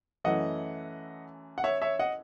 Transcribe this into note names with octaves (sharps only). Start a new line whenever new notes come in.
F#2 E3 A3 D#5 F#5
F#5
C#5 E5
C#5 E5
D#5 F#5